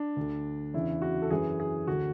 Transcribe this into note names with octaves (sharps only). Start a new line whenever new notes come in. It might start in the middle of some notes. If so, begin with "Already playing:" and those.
Already playing: D4
D2 D3
E2 C#3 E3 E4
F#4
A4
F#2 E3 G#4
G#4
D2 D3 F#4